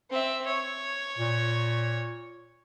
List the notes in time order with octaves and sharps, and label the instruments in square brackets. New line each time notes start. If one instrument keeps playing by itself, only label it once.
[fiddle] C4 E5
C#5
[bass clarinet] A#2